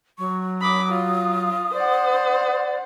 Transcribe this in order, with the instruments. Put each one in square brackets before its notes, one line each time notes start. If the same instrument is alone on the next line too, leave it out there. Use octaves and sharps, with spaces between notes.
[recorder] F#3 [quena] C#6
[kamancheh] B5 D6 [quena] D#6
[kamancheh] F4
[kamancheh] C5 F#5 [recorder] D5